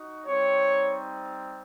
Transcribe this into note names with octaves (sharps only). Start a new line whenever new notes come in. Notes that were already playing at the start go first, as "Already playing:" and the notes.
Already playing: D#4 F#4
G3 C4 D#4 C#5